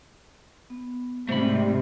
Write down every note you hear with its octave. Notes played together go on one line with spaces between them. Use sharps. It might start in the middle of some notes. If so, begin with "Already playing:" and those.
B3
G#2 C3 G3 A3 C5 B5